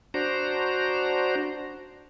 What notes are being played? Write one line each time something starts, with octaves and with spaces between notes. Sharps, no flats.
D4 F#4 C5 A#5